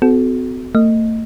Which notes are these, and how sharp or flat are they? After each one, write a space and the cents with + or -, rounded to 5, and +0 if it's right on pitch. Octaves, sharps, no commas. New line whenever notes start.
C4 -45 F#4 +0 A4 -25
A3 +35 D#5 +0